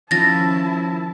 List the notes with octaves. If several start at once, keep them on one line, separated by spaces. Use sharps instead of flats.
D#3 F3 C#4 E4 A5 A6 A#6